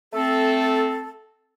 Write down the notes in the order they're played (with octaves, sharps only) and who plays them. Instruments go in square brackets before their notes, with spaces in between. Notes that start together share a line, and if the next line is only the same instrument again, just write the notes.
[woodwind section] A3 C4 A4